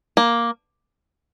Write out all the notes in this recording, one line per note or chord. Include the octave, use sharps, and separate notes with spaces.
A#3